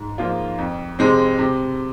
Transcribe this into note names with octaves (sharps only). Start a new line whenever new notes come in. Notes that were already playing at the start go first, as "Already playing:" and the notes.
Already playing: G#2
F3 A#3 F4
F2
C3 G#3 C4
C3